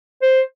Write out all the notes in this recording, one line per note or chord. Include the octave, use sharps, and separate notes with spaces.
C5